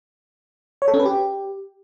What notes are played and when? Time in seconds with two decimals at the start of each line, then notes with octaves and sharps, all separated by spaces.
0.82 C#5
0.88 A4
0.94 C#4
1.00 B4
1.05 G4